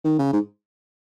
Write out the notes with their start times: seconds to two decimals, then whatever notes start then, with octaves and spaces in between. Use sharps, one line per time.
0.04 D#3
0.19 C#3
0.33 G#2